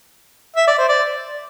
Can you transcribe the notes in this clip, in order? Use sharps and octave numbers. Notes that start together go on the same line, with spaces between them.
E5
D5
C5
D5